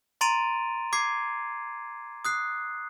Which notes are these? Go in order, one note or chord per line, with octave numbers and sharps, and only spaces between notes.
A#5 C6 A6 D7 D#7 F7
D6 G#6 C7
D#6 F#6 C7